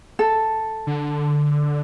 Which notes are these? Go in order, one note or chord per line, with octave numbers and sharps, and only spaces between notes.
A4
D3